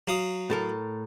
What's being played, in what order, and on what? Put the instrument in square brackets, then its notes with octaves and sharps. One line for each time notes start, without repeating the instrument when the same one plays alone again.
[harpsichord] F#3 F5 D#6
[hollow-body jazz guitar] A2 A4 A#4